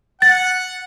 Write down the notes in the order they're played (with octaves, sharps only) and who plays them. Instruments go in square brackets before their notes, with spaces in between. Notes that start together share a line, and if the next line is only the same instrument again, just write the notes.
[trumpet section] F#5 [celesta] A6